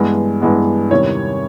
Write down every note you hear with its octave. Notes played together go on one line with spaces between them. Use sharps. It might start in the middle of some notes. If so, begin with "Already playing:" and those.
Already playing: G2 E3 G#3 B3
G2 E3 G#3 B3
E2 C3 D#3 G3 C#5